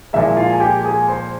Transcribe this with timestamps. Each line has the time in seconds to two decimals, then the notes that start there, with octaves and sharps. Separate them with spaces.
0.13 A#2 F3 G#3 E4 E5
0.37 F4 F5
0.50 G#5
0.60 G4 G5
0.84 G#4 G#5
1.08 C5 C6